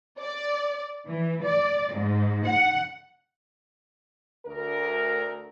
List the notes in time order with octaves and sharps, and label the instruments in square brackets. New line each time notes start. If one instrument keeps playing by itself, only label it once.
[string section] D5
E3
D5
G#2
F#5
[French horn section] D2 A#4